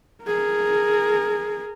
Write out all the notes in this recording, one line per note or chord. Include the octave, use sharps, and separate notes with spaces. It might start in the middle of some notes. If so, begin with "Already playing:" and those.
G#4 A#4